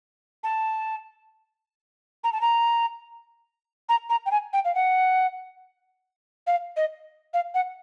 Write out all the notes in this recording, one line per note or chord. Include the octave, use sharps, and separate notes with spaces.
A5
A#5
A5
A#5
A#5
A#5
G5
G#5
G5
F5
F#5
F5
D#5
F5
F#5